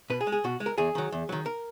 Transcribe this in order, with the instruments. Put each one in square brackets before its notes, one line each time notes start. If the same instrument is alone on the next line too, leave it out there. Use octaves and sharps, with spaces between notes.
[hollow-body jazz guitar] B2 B4
G#4
G#3
G#4
B2 F#4
G#3
A#4
E2 G#4
D#3 F#3
E2
D#3 F#3
A#4